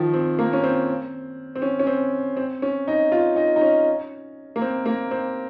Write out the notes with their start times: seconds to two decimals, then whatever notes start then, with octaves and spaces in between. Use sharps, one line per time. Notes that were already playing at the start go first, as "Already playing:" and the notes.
Already playing: D#3 F3
0.14 C4
0.39 A#3
0.53 C#4
0.64 C4
1.55 C4
1.62 C#4
1.79 C#4
1.87 C4
2.37 C4
2.62 C#4
2.88 D#4
3.12 F4
3.36 D#4
3.56 D#4
3.61 C#4
4.56 A#3
4.61 C4
4.86 A#3
5.11 C4